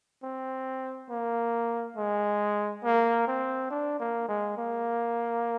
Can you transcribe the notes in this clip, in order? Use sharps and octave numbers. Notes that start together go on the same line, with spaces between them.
C4
A#3
G#3
A#3
C4
D4
A#3
G#3
A#3